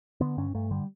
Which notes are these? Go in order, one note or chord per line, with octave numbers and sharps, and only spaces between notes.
D3 B3
G2 C#4
G2 A3
D3 G3